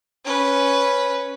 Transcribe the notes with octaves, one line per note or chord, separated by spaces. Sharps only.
C#4 B4